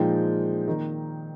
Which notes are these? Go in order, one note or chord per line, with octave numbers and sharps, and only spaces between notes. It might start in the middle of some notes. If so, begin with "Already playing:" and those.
Already playing: A#2 F3 G#3 D#4 G5
D#3 A#3 D#4